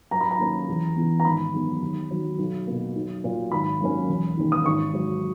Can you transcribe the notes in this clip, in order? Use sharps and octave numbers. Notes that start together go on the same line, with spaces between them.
F#2 A#5
B5
A#5
D#3 A#3 C#4
E2
C#3 E3 B3
A#5
G#1 B5
F#2 D#3 G#3 B3
D#2
D#3 F#3
B1
B2 A#3
B1
A#2 F#3
G#1 B5
F#2 D#3 A#3 C#4
E1
D#2 D#3 A#3 C#4
D#6
G#1 C#6
G#2 F#3